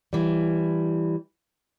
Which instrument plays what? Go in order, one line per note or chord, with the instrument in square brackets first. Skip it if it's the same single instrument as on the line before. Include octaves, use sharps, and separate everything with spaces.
[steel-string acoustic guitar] E3 G3